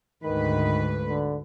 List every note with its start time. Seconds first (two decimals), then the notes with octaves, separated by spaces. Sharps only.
0.22 D2 G#2 D#3 B4
1.08 D3